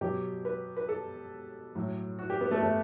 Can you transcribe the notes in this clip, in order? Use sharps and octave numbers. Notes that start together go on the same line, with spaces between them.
B2 F#3 G4
B4
B4
A4
A2 F#3
F#4
G4
B3
A3
A3